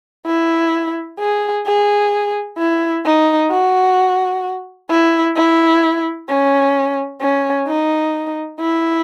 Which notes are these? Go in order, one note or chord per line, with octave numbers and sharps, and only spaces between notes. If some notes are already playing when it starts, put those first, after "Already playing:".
E4
G#4
G#4
E4
D#4
F#4
E4
E4
C#4
C#4
D#4
E4